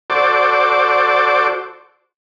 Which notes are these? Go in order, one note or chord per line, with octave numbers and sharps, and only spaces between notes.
F#4 A4 C5 D5 D6